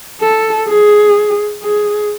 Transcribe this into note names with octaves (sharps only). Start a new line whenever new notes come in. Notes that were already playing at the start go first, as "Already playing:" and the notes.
A4
G#4
G#4